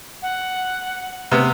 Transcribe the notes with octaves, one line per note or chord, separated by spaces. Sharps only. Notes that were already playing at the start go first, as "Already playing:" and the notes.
F#5
C3 B3